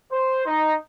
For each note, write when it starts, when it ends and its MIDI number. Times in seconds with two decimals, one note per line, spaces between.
0.11 0.42 72
0.46 0.75 63